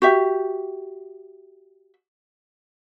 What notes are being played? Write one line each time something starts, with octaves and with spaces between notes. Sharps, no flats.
F#4 G4 E5